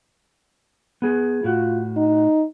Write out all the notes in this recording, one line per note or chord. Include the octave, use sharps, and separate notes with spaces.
B3 G#4
A2 F4 F#4
D#4